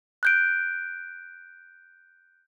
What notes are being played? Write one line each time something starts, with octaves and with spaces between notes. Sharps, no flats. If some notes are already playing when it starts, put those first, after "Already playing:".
F#6 G6 D7